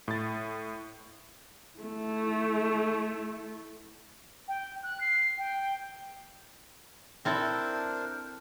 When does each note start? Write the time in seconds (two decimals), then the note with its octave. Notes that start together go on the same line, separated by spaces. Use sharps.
0.08 A2 A6
1.78 A3 E4
4.48 G5
4.83 F#6
5.01 C7
5.38 G5
7.25 C4 D4 E4 A4 A#4 C5